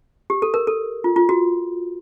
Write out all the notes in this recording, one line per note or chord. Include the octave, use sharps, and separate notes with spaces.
G4
A4
A#4
A4
F4
F4
F#4